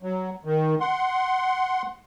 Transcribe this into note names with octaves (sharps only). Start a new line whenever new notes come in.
F#3
D#3
F#5 C6